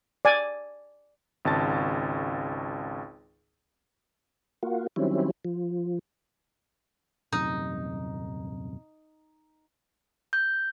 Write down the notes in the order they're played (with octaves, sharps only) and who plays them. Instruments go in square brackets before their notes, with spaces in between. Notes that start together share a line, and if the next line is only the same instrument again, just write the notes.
[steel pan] D5 G#5
[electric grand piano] G#1 C#2 A5 A6
[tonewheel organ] A#3 F4 F#4
D#3 F#3 G3 C4 C#4 E4
F3
[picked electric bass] D#1 F#2 C3 [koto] D#4
[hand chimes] G6